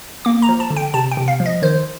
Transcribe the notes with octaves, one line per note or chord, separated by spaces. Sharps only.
A#3 D6
A#5
F3
A5
D3
G5
C3 A5
G5
C3
F5
F3
D#5
D#3 C5